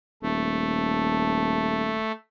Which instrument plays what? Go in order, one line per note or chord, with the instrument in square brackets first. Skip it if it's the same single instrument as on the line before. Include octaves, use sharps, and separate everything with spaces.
[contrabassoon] D#1 [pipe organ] A3